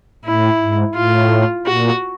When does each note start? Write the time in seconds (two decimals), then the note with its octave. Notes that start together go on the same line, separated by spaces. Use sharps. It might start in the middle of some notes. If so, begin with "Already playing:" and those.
0.25 A2 E4
0.59 G#2
0.95 A2 F4
1.66 A#2 F#4